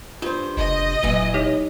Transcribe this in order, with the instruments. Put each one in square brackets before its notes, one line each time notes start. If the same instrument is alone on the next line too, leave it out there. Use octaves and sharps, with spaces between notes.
[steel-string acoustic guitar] G2 C5 [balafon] F4
[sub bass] F1 [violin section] D#5
[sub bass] E1 [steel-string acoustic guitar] A#2 E3 [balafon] F#3
[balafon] D#4 G4 C#5